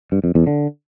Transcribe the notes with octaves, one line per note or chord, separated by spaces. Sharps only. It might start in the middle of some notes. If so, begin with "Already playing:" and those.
G2
F2
E2
D3